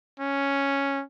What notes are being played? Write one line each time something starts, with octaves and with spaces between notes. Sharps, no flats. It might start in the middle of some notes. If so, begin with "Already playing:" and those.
C#4